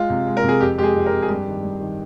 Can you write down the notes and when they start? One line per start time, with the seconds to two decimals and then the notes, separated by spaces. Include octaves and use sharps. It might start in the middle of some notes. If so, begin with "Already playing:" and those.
Already playing: G#3 F4
0.10 C3
0.27 G#3
0.37 A#4
0.43 C3
0.49 G#4
0.60 F2 G4
0.78 G#3 G4
0.83 G#4
0.95 F2
1.06 A#4
1.12 F2
1.22 G#4
1.29 G2 G4
1.46 D#3
1.63 G3
1.80 D#3